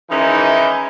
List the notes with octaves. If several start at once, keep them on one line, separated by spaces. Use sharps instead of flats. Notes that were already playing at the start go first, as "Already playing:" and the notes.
D#3 E3 G#3 C#4 D#4 E4